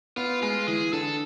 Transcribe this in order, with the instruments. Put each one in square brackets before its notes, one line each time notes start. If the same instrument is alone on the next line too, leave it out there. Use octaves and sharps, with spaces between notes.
[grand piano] B3 [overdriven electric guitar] F4
[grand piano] G#3 [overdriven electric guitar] F4
[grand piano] E3 [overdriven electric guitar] G#4
[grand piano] D3 [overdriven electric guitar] A4